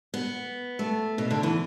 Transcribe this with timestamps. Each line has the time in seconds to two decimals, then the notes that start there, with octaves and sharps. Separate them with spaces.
0.14 B3
0.79 A3
1.18 B2
1.31 D3
1.43 E3